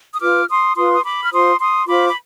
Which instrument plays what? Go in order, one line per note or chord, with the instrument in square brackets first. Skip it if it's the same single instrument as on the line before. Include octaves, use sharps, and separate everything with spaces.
[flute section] D#6
F4 B4 D6 F6
C6 D#6
F4 B4 C6 D#6
D#6
B5 D6
F6
F4 C5 C6 D#6
C6 D#6
F4 C5 B5 D6
B5